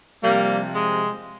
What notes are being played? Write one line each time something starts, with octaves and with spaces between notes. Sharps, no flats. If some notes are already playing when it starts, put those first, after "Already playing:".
C3 F3 G3 A#3
G#3